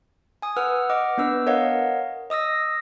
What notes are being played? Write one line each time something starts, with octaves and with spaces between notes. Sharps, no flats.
G#5 D#6
B4 F#5 E6 F6
D#5 F#5 D6 F6
B3 D4 B4 E6
A#4 C#5 D#5 F5 F#5
D#5 D#6 E6 A#6